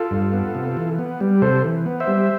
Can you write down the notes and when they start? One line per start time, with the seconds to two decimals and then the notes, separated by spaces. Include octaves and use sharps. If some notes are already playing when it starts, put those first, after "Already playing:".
Already playing: F4 A4
0.11 G2
0.33 B3
0.55 C3
0.77 E3
0.99 B3
1.20 G3
1.42 C3 A4 C5
1.64 E3
1.86 B3
2.00 C5 E5
2.08 G3